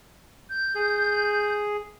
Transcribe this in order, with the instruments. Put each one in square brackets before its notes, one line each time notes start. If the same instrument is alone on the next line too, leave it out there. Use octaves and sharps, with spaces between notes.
[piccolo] G6
[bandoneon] G#4